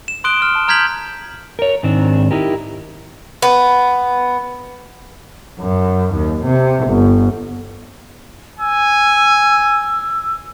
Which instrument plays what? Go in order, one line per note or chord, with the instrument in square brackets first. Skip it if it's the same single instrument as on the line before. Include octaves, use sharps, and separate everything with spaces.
[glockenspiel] E7
C6 D#6 F#6 D7 G7
F6
A5
A#5 F6 G6 G#6 B6 F#7
[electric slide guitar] A#4 C#5
G#2 D#3 C4 D4
D#4 E4 G4 A#4
[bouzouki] B3
[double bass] F#2
D#2
C3
G1
[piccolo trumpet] G#5 [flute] E6